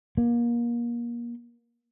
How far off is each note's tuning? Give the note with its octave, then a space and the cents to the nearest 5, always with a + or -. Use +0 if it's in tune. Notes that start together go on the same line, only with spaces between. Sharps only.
A#3 +30